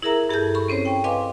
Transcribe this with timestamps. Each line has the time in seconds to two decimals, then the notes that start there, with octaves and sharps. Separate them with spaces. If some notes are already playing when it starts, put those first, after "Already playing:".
0.02 E4 G#4 A#4 E5 A#5
0.29 G2 G#4 A4 A5 G6
0.55 B5 C#6
0.68 C4 C#4 C5 C#5
0.85 G5
1.04 B4 D#5 F5 G#5 C6 D6